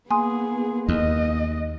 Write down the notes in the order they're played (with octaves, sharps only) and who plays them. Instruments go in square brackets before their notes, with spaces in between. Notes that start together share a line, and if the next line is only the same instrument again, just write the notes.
[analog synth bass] A#3 [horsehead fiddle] B3 G#4 [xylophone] G#5 C6 D#6
[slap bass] D#2 [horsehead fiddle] D#5